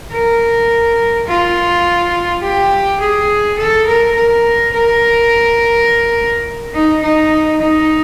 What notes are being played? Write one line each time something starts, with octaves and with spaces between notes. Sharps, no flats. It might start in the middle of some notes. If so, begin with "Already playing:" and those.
A#4
F4
G4
G#4
A4
A#4
A#4
A#4
D#4
D#4
D#4